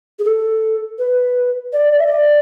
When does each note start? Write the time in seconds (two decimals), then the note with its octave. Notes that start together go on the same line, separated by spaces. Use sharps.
0.19 G#4
0.24 A4
0.99 B4
1.73 D5
1.91 D5
1.99 E5
2.07 D5